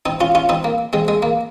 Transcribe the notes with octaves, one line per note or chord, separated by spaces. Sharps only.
C4 D#4
C#4 F4
C#4 F4
C4 D#4
A#3
G#3 C4
G#3
A#3